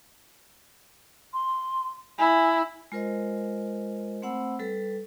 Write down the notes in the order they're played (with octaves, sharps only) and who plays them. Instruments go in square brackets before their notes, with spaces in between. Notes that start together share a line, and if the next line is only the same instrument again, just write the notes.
[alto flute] C6
[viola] E4 [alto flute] G#5
[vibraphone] G#3 F4 A#4 C5 D#5
A3 C4 C5 F#5 B5 E6
G3 A4 B4